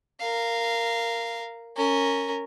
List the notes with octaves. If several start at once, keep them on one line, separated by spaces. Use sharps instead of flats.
A#4 F5
C#4 A#4